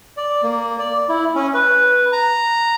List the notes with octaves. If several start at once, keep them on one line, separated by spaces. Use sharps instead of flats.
D5
A#3
D5
E4
C#4
B4
A#5